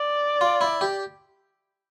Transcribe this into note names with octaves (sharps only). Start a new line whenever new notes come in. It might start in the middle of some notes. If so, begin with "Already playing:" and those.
Already playing: D5
F4
E4
G4